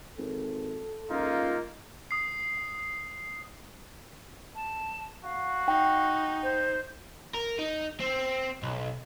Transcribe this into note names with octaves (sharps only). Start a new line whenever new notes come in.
G#1 A4
C#2 A#3 D#4 F4
D#6 C7
A5
F#4 F5
D#4 G5
C5
A#4
D#4
C4
B1